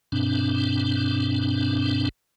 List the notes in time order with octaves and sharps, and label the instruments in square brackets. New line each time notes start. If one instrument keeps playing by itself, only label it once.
[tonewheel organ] G2 B2 C4 D4